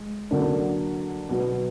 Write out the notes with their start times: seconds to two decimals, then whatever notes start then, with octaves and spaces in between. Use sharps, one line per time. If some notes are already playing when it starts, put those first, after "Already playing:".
Already playing: G#3
0.31 D3 F#3 A#3 D4
1.29 B2 F#3 B3